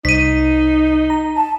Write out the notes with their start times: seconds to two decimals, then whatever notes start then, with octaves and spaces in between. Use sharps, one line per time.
0.05 C2 D#4 B6 D#7
1.10 A#5
1.37 A5